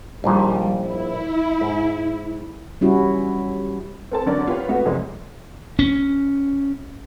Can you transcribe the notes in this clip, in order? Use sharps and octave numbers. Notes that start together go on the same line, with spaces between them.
A#1 D#2 A#2 G3
E4
G#2
G3 C#4 E4 F#4
C4 A4 A5
D3 F#3 C#4 A#4 D5
B3 F4 G4 B4 C#5
A3 B3 F#4
F1 F2 C3 G#3 C#4
C#4